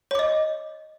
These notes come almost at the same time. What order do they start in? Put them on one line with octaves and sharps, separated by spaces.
C#5 D6 D#5